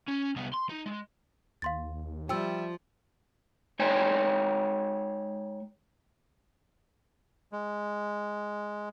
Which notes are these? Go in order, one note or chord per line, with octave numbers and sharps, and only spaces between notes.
C#4
C2 B3
C6
D#4
G#3
D#2 F5 C6 A6
F3 G3 E5 G5 E6
G#3 D#4 C#5 G5 G#5
G#3